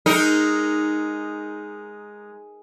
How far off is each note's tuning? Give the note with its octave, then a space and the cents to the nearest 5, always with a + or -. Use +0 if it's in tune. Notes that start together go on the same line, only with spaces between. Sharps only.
G#3 +0 D#4 +0 A#4 -10